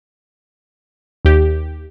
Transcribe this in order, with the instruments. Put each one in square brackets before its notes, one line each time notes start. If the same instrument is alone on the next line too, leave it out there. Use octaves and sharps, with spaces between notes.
[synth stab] D#2 G4